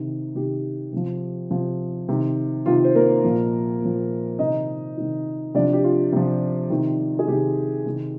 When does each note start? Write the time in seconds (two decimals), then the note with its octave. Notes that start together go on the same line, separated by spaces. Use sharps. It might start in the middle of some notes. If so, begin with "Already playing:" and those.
Already playing: C3 D#3
0.35 C3 D#3 G4
0.92 C3 F3
1.51 C3 F3
2.08 C3 D#3
2.66 C3 D#3 F4
2.84 C5
2.95 A#3 A#4
3.24 A#2 F3
3.81 A#2 F3
4.39 C3 D#3 D#4 D#5
4.98 C3 D#3
5.54 C3 F3 D4 D5
5.73 G4
5.84 F4
6.12 C3 F3
6.70 C3 D#3
7.19 G#4
7.28 C3 D#3 G4
7.86 C3 D#3